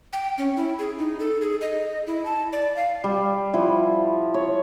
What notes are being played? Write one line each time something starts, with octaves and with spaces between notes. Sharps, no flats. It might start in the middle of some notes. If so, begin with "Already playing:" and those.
G5
C#4
E4
G#4
D#4
A4
G#4
D#5
E4
A5
D5
F5
G3
F3 E4 F#5
C#5